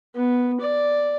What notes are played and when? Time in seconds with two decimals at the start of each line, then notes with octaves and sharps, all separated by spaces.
0.16 B3
0.61 D5